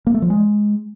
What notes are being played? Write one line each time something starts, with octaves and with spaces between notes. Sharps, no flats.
A#3
A3
F3
G#3